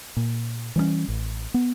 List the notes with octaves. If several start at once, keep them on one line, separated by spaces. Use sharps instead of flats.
A#2
E3 G3 G#3 C#4
A1
B3